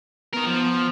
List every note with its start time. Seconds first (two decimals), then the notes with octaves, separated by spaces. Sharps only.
0.34 B3 D#4 A#4
0.47 F3